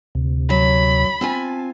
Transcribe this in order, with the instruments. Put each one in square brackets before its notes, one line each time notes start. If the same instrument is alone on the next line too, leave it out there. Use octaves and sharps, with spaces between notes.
[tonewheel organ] D2 C3
[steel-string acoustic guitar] F#3 [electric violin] B5
[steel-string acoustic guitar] C4 F4 G#5 [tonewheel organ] A5